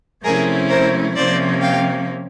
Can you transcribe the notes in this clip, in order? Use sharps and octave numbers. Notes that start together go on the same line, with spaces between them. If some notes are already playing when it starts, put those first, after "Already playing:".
C3 F3 A3 C#4 E4 G#4 A#4
A#4 C5
C3 F3 A#3 C#4 C5 D5
F5 G5